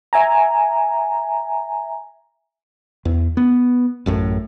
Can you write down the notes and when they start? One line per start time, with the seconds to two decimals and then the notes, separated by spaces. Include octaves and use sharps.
0.13 E5 G#5 A#5
3.05 E2
3.37 B3
4.06 A1 F#2 A2